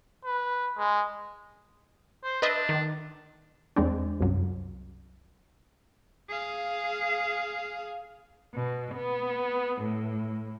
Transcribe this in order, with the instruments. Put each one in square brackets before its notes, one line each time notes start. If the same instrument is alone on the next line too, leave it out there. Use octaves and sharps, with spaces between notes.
[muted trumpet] B4
G#3
[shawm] C5
[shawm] D4 [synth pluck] B4 D#5 E5
[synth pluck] D#3
[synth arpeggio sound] E2 G#3 C4 D4
C2 F#2
[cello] G#4 F5
[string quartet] B2
B3
A2